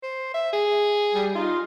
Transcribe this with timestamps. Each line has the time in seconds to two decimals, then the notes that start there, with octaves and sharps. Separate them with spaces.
0.03 C5
0.34 E5
0.53 G#4
1.14 G3
1.34 D#4 F4